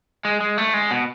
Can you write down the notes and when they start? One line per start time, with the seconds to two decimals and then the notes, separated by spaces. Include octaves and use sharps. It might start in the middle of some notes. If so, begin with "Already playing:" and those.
0.25 G#3
0.41 G#3
0.58 A3
0.74 G#3
0.91 B2